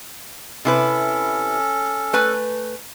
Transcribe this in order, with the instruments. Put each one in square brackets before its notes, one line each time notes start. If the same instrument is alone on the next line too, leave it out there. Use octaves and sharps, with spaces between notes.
[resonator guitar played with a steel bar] C3 E4 B4 [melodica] C#4 A4
[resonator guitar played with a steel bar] A3 B4 G#5